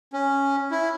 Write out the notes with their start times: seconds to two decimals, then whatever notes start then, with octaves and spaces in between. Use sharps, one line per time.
0.13 C#4
0.71 E4